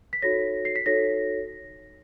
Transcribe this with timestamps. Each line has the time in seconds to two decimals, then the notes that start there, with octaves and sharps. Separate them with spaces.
0.13 B6
0.22 D#4 F#4 A4 C#5 A#6
0.65 C7
0.76 B6
0.86 D#4 F#4 A4 C#5 A#6